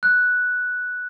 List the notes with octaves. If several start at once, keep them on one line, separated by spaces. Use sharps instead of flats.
F#6